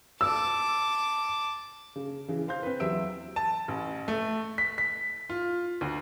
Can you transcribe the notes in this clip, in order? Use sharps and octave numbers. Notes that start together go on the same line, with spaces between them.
A5 D6 E6
C#3
C#3 E3
C5 F5 C6 G6
C4 B4
E2 F#3 G4 E5 E6 D7
A5
A1
A3
B6
B6
F4
D2